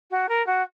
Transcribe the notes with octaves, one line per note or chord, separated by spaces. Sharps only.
F#4
A#4
F#4